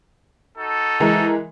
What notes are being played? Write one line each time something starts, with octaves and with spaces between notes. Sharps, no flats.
D#4 F#4 A4
E3 G#3 A#4